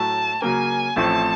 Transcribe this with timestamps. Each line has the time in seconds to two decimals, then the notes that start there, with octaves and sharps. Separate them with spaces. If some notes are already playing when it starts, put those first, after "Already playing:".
Already playing: A2 F#3 A3 A5
0.42 C#3 F#3 A#3 G#5
0.96 A1 A2 F3 A3 C4 A5